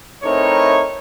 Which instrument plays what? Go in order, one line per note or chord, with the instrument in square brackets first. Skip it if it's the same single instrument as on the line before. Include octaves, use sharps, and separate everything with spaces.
[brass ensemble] A3 C4 D#4 E4 A#4 C#5